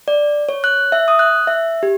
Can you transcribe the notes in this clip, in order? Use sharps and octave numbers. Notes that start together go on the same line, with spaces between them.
D5
C#5
F#6
E5
D#6
F#6
E5
G4